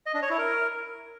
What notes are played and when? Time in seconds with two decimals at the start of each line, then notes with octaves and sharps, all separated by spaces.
0.06 D#5
0.14 D4
0.22 C#5
0.30 E4
0.38 A#4